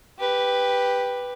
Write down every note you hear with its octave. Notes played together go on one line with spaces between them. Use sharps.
G4 B4